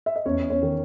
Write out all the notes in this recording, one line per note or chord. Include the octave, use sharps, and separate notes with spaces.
E5
D#5
E2 C#4 C#5
C#4 C#5
D#3